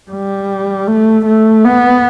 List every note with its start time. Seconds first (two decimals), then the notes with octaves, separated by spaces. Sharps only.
0.11 G3
0.87 A3
1.26 A3
1.65 B3